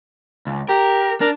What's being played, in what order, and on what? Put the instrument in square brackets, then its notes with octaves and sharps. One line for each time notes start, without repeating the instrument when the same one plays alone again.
[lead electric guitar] C#2
[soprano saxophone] G4 [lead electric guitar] A#4
[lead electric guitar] D4 [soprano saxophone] A#4